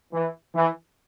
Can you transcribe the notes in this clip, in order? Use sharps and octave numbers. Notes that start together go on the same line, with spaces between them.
E3
E3